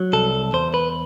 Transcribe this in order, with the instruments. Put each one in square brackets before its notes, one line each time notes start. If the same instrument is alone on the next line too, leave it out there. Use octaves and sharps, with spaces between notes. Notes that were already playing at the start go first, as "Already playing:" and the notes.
Already playing: [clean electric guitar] F#3
C2 A4
E2 C5
B4